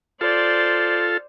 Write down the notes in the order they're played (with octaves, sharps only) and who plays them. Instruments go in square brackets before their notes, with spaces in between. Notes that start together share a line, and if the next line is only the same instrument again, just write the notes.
[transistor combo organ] F4 A4 [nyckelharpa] C5 D5